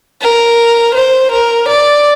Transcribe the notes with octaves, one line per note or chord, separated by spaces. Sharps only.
A#4
C5
A#4
D5